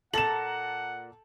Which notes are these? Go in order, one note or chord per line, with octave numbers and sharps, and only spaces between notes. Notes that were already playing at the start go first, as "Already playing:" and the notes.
A#2 A4 F#5 A5 A#5 E7 F#7